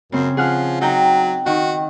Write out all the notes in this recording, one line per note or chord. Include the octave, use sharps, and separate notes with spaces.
F#2 C#3 C4
F3 G#4 F#5 F6
F#3 D#4 G5 A#5
D#3 F#4